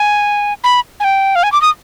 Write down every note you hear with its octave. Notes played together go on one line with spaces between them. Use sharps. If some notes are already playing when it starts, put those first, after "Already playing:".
Already playing: G#5
B5
G#5
G5
F5
G#5
D6
D#6